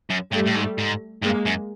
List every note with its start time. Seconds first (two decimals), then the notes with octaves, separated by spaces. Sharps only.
0.10 F#2
0.33 G2 G3 A3
0.47 A2
0.56 G#2
0.79 G#2
1.23 G2 G#3 A#3
1.46 F#2